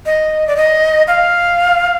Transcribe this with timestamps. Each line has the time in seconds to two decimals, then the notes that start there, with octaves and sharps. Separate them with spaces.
0.06 D#5
0.47 D5
0.57 D#5
1.08 F5